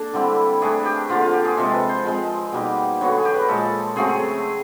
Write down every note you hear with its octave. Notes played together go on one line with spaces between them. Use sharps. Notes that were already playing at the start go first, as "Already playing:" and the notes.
Already playing: A#3 D4 A4
D3 G3 C4 E4
E3 A3 D4 G#4
G4
D3 F3 A#3 F4
F4
G4
G#4
C3 F3 G#3 A4
B4
C5
F3 G#3 C4
B2 G3 A#3 D#4
D3 F#3 B3 C#5
G#4
G4
B4
A#4
A#2 F3 G#3 A4
C#3 F#3 A3 C4 G#4